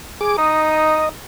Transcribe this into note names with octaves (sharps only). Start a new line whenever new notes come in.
G#4 D6
D#4 D#5